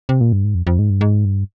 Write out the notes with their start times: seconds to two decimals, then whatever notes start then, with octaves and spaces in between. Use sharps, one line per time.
0.09 C3
0.21 A#2
0.33 G2
0.44 G#2
0.55 F2
0.67 F2
0.79 G#2
0.90 G2
1.01 G#2
1.25 G2